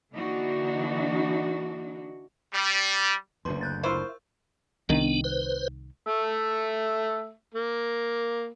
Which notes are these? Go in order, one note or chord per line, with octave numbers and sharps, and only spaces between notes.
D3 E3 A#3 D4 D#4 F#4
G3
F#1 D2 B4 C6
F#6 G6 A6
E4 F4 A#4 C5 C#6 E6
C2 D#3 B3 D4
B4 C5
A3 E5
A#3